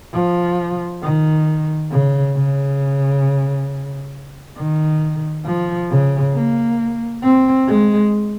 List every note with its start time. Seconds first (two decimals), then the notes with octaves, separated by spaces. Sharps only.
0.14 F3
1.02 D#3
1.91 C#3
2.35 C#3
4.57 D#3
5.45 F3
5.90 C#3
6.34 A#3
7.23 C4
7.68 G#3